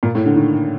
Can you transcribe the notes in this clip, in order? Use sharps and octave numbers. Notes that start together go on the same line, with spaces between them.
A#2
A2
D3
D#3